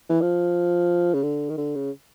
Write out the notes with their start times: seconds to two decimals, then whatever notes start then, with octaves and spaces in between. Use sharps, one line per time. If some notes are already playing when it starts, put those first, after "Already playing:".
0.09 E3
0.21 F3
1.14 C#3
1.23 D3
1.49 D#3
1.58 D3
1.75 C#3